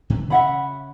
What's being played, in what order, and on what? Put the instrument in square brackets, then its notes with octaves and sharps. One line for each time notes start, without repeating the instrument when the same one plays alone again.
[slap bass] B2 D#3 E3
[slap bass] C#3 C#4 [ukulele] E5 F#5 B5